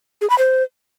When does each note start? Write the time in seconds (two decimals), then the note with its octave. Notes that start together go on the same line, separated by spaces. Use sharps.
0.21 G#4
0.30 B5
0.38 C5